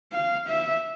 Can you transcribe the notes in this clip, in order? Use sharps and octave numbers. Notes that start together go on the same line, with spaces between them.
F5
E5